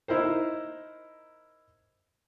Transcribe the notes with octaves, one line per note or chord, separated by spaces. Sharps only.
D#4 E4 A#4 C5